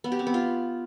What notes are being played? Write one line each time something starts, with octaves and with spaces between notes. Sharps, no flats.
B3
G4
C4
B3
F4